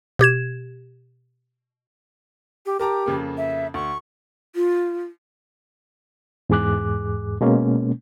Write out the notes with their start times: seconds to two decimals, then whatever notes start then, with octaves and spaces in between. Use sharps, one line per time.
0.19 B2 G4 G#6 E7
2.66 G4
2.79 G4 A#4 A5 A#5
3.06 F2 C#3 A#3
3.37 E5
3.74 D2 C#6
4.56 F4
6.50 E2 G#2 G#4 D6 F#6
7.41 B2 G#3 A#3 C#4